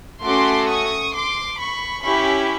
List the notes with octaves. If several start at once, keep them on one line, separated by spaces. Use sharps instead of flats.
A3 C#4 F#4 A4 C6 D6
C#6 D#6
C6 D6
B5 C#6
C#4 E4 G4 B5 C#6